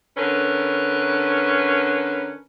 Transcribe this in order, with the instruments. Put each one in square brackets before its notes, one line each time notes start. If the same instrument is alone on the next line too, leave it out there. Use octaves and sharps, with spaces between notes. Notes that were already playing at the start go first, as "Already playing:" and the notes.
[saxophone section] D3 C#4 A#4 B4